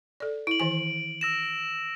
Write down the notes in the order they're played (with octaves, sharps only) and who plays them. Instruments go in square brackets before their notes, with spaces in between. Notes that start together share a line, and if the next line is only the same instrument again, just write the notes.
[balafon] A4 D5
[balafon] E4 [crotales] D7 F#7
[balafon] D#3 E3 G#5
[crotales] E6 A#6 E7